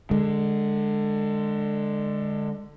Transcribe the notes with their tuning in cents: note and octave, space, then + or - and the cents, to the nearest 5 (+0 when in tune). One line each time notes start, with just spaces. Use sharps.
D3 +20 G#3 +0